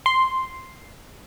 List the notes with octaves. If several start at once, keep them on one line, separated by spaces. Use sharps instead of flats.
C6